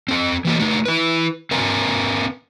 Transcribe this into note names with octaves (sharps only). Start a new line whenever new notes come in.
C4 A4
E3 A#3 G4
A3 D#4 G4
E4 B4
C4 A#4 B4 G#5 A#5